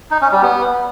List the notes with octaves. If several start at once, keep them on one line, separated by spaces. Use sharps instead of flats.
D#4
C#4
G3
B3